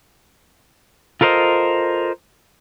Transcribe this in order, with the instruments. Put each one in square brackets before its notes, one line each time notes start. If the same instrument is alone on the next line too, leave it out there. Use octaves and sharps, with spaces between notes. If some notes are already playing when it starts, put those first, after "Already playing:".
[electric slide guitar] F4 A4 A#4 C5 D#5